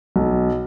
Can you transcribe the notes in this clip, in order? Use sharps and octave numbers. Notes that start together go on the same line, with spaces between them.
B1